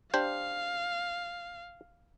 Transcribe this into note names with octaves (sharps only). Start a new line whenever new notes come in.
D4 G4 C5 F5